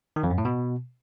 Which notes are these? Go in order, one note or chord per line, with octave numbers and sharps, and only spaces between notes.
D#3
F2
F#2
A2
B2